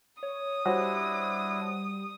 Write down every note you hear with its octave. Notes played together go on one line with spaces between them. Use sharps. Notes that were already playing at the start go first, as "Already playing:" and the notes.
C#5 D#6
G3 D4 E4 F#4 C5 C#5